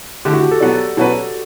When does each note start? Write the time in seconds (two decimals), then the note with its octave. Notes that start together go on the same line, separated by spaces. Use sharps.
0.25 D3 A3 E4 G4
0.34 F#4
0.43 G4
0.51 A4
0.60 B2 F#3 B3 D5
0.97 B2 F#3 C#4 F#4 B4